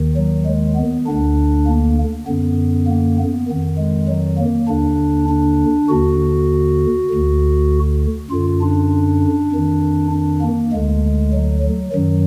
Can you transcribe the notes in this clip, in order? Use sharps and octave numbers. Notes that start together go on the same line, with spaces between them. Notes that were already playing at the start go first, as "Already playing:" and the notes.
Already playing: D#2 D#3
F#3
G#3
B3
D2 D3 D4
A#3
F#2 D3 B3
A#3
B3
F2 D#3
G#3
F#3
A#3
D#2 D3 D4
D4
D#2 D3 F#4
D2 D3
F#2 D3 F4
D4
F2 D#3
D4
A#3
D2 D3 G#3
F#3
F#3
F#2 D#3 F#3